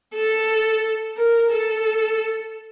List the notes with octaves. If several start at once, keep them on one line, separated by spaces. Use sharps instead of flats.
A4
A#4
A4